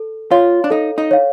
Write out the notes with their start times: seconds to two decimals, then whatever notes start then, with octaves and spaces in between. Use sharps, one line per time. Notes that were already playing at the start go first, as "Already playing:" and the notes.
Already playing: A4
0.31 F4 C#5 F5
0.64 D4
0.70 D#4 A4
0.98 D#4
1.11 C#5 F5